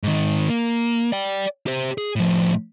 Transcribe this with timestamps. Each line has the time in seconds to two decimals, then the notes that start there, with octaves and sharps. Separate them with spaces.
0.03 G#2 D#3
0.49 A#3
1.12 D5 G5
1.67 G4 C5
1.98 G#4
2.16 A2 F3